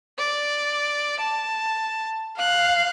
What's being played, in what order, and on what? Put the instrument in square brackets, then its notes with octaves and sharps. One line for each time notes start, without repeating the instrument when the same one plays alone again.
[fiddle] D5
A5
[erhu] F5 [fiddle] F#6